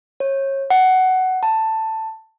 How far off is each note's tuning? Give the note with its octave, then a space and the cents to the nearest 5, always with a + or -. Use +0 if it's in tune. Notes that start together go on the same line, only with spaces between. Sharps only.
C#5 -30
F#5 +15
A5 +10